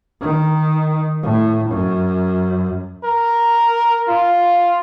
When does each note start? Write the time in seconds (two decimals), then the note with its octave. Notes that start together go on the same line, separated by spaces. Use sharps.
0.21 D#3
1.23 A2
1.70 F#2
3.04 A#4
4.08 F4